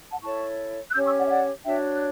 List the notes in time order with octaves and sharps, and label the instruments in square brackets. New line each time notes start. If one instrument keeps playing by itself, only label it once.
[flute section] F#5 A5
E4 A4 C#5 A5 C#6
F#6
C#4 G4 C#5 E6 G6
C#6 E6
D5 F#5
E5
D5 F#5
D4 F#4 C#5 E5 G5
F#6